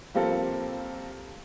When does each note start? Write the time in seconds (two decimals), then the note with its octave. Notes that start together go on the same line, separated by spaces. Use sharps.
0.14 F3 G3 A#3 C4 A4